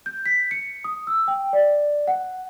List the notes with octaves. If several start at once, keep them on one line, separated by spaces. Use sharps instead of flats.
G6
B6
C#7
D#6
E6
G5
D5
F#5